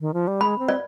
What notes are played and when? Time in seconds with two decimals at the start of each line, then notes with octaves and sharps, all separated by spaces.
0.01 D#3
0.14 F3
0.28 G3
0.41 G#3 B5
0.59 C4
0.69 D5